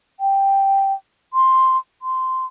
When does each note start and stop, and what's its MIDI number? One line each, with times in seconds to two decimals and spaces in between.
0.20 0.93 79
1.34 1.77 84
2.02 2.45 84